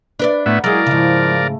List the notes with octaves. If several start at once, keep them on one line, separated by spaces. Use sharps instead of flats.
D4 B4 D5
A2 A3 B3 E5 F#5 A#5
F#3 G#3 E4 G#4 A#4 D5 F5 D6
G#2 C#3 F3 E4
A3